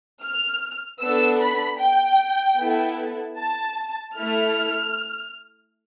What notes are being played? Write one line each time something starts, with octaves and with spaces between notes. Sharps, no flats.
F6
B3 D4 A4 E6
B5
G5
B3 E4 A4
A5
A3 E4 A4 F6